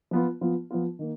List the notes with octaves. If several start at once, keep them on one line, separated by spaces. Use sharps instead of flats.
F3 B3 F4
F3 B3 F4
F3 B3 F4
D#3 A#3